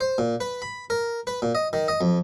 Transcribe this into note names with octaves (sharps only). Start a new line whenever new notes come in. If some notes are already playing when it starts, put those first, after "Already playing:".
C5
A#2
B4
B5
A#4
B4
A#2
D#5
D#3
D#5
F2